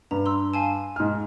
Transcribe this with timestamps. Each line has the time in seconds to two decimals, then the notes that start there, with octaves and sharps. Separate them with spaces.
0.11 G2 A#5
0.26 C6 E6
0.54 F5 G#5 A5
0.96 G#2 F6